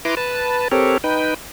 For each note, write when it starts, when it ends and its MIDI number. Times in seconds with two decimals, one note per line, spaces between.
0.05 0.15 64
0.05 0.15 71
0.05 0.15 82
0.05 0.15 84
0.05 0.15 86
0.17 0.68 71
0.17 0.68 81
0.72 0.98 60
0.72 0.98 67
0.72 0.98 69
0.72 0.98 70
0.72 0.98 73
1.04 1.34 63
1.04 1.34 71
1.04 1.34 79